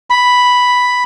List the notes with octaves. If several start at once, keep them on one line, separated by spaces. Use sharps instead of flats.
B5